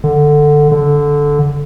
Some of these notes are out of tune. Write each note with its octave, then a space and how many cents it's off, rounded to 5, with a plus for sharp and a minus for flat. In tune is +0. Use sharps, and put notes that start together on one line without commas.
D3 +10
D3 -10